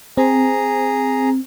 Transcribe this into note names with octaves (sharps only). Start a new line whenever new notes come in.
C4 G#4 A#5